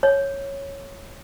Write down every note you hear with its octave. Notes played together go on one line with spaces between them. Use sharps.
C#5